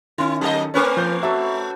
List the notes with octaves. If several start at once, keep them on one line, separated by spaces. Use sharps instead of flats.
D#3 C#4 E4
F#3 A#3 A4 D#5
A3 C4 C#4 A#4 B4 C#5
F3 G6
F#3 F#4 A4 E5